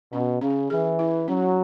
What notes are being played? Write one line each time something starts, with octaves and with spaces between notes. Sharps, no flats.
B2 C#4
C#3 C#4
E3 G#4
E4
F#3 C#4